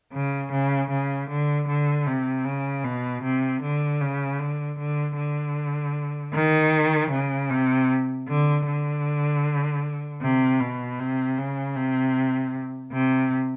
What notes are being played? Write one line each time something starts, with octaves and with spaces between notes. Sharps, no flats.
C#3
C#3
C#3
D3
D3
C3
C#3
B2
C3
D3
C#3
D3
D3
D3
D#3
C#3
C3
D3
D3
C3
B2
C3
C#3
C3
C3